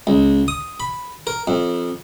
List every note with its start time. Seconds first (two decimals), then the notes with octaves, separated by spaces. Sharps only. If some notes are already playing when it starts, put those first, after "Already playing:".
0.07 C#2
0.48 D#6
0.80 B5
1.27 A#4
1.47 F2